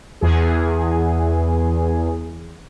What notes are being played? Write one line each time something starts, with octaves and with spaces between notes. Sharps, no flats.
E2 G#4